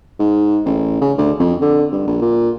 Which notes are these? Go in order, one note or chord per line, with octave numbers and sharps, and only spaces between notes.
G#2
A1
C#3
D2
F2
D3
G2
A#1
A#2